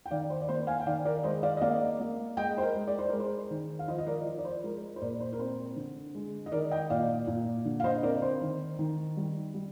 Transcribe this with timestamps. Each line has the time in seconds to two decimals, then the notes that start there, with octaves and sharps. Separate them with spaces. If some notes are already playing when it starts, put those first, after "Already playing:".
0.06 G5
0.11 D#3 D5 F5
0.30 C5
0.42 D5
0.49 A#3 C5
0.67 F5 G#5
0.80 G5
0.86 D#3 D5 F5
1.05 A#4 D5
1.24 G#3 C5 D#5
1.43 D5 F5
1.57 D#5
1.61 A#3 D5 F5
2.00 A#3
2.37 G#3 D#5 G5
2.58 C5
2.62 A#4
2.75 G#3
2.87 D5
2.99 C5
3.08 G#3 A#4
3.20 C5
3.51 D#3
3.79 F5
3.88 F3 C5 D#5
3.98 D#5
4.07 A#4 D5
4.26 F3
4.38 D5
4.45 C5
4.63 G#3 A#4
4.96 C5
5.01 A#2 A#4 D5
5.20 C5
5.33 A#4
5.39 C4 C5
5.76 D3
6.15 G#3
6.46 D#5
6.52 D#3 A#4 D5
6.71 D#5 G5
6.90 A#2 D5 F5
7.27 A#2
7.65 D3
7.80 F5
7.84 C5 D#5
8.03 C4 A#4 D5
8.22 C5
8.41 D#3
8.79 D#3
9.17 G3
9.54 G3